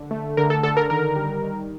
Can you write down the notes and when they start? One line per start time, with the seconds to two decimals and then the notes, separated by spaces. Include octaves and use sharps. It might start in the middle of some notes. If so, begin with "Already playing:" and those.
Already playing: D3
0.11 A3
0.37 D3 A#4
0.50 A4
0.63 D3 A4
0.77 A#4
0.90 D#3 A#4
1.16 G3
1.43 D#3